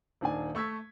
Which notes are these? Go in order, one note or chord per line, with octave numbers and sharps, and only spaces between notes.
D#1 D#3 D4 G#5
A3 C#6 E6 G#6 B6